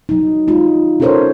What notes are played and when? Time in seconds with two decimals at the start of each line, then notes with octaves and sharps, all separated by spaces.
0.09 F#3 D#4
0.47 G#3 D#4 F4
1.00 C#4 E4 A4 A#4 C5 C#5